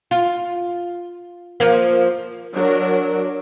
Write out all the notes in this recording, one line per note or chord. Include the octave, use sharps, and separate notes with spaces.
F4
F3 A#3
F#3 D4 A#4